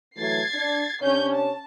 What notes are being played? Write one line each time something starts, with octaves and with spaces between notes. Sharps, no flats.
E3 F#3 A3 G#6 A6 C7
D4
C3 C#4 D4 C#5 G6
A5